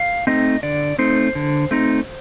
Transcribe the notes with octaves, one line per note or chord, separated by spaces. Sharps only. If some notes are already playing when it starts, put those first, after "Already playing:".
Already playing: F5
A3 C4 D#4 D#5
D3 D5
A3 C4 D#4 C5
D3
A3 C4 D#4